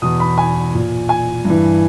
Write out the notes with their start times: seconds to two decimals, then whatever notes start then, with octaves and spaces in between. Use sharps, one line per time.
0.02 E2 B2 D#6
0.20 B5
0.38 G#5
0.74 A#2
1.09 G#5
1.45 G2 E3